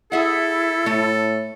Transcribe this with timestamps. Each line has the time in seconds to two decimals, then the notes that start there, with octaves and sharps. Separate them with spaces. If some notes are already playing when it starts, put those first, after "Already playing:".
0.12 E4 G#4 A4 E5 F#5
0.86 A2 A3